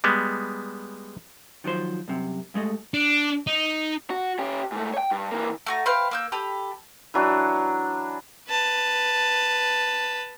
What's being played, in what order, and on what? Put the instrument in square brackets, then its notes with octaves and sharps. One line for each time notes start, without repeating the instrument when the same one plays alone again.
[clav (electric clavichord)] G3 G#3 B3
[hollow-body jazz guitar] D#3 F3 F#3 C5
C2 F#2 C3
G2 G#3 A3 D#5
[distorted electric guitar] D4
D#4
[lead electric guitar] F#4
C#4 G4
G#2 A3
C#5 G5
G2
E3 A#3
[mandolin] A3 F#4 A#5
B4 C5 F5 G5
A#3 E6 G6
G4 A4 B4
[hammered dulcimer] E3 F#3 D4
[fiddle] B4 A5